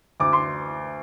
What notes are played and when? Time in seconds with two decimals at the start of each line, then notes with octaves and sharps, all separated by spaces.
0.20 D2 D6
0.33 C6